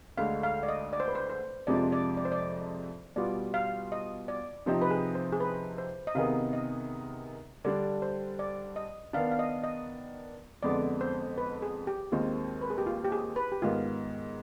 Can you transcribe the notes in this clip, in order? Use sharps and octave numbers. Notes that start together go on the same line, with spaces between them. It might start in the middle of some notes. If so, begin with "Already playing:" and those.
D2 D3 G#3 F5
F5
D5
D#5
D5
C5
B4
C5
C5
F2 C3 F3 G#3 D4 D5
D5
D5
C5
D5
B2 G3 B3 F4 D5
F5
D#5
D5
C3 F3 C4 D#4 G4
B4
G#4
C5
G#4
B4
C5
D#5
C3 D#3 B3 D#4 G#4 F5
D#5
D3 G3 D4 D5
C5
D5
D#5
D#3 B3 D4 F5
F5
D#5
D#5
F2 D3 G#3 B3 D5
C5
B4
G#4
G4
D#2 D#3 G#3 C4 F4
B4
G#4
G4
F4
G4
G#4
B4
G4
G#2 D#3 B3 F4